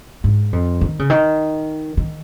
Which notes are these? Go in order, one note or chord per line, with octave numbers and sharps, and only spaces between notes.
G#2
F2
D#3
C#3
D#3
D#3